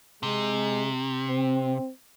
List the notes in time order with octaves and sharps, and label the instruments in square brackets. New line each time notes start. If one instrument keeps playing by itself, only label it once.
[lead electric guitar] C3 [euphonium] G#3
[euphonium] C4